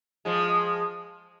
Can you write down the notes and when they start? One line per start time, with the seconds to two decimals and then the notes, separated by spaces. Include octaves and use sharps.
0.25 F3 G#3